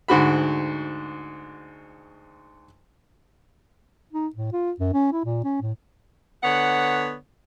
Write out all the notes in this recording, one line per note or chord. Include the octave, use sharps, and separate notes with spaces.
D2 G#2 F#4 B5
D#4
A2
F4
F#2
C#4
E4
A#2
C#4
A2
D3 B3 C#5 F#5